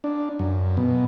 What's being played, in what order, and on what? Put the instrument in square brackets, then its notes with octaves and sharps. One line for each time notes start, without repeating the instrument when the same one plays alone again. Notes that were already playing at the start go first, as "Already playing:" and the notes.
[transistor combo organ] D4
F#2
B2